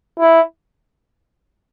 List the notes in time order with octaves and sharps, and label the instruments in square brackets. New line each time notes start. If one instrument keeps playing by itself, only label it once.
[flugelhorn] E4